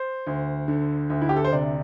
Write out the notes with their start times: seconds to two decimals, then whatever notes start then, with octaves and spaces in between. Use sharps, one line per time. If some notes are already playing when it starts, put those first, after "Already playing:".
Already playing: C5
0.27 D2
0.68 D3
1.10 D2
1.21 E4
1.29 G4
1.36 A4
1.44 C5
1.52 C3 D5